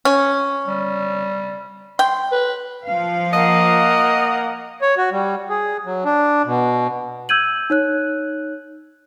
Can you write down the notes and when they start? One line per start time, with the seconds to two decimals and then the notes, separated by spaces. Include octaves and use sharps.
0.05 C#4
0.67 G3
1.99 G5 C6
2.32 B4
2.85 F3 F5
3.33 A#3 D#5 F#5
4.82 C#5
4.97 F#4
5.12 G3
5.50 G#4
5.86 F#3
6.05 D4
6.45 B2
7.29 E6 G6 G#6 D#7 F#7
7.70 D#4 C#5 F#6